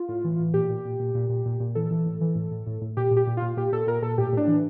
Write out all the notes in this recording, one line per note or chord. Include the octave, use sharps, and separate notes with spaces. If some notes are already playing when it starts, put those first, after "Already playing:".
Already playing: F4
A2
E3
A2
A#2 G4
A#2
A#2
A#2
A#2
A#2
A#2
A#2
E3 A4
E3
A2
E3
A2
A2
A2
A2
A#2 G4
A#2
G4
A#2
A#2 F4
A#2 G4
A#2 A4
A#2 A#4
A#2 A4
A2 G4
A2 D4
E3